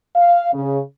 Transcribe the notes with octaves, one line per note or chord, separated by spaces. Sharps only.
F5
C#3